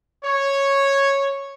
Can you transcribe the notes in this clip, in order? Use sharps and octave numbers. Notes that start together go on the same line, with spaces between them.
C#5